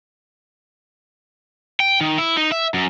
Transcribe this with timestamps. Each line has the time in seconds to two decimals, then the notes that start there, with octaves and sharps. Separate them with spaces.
1.80 G5
2.01 D#3
2.18 E4
2.37 D#4
2.52 E5
2.74 F#2